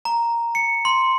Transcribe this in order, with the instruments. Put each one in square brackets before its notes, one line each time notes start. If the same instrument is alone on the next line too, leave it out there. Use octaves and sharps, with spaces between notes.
[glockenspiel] A#5
C#7
C6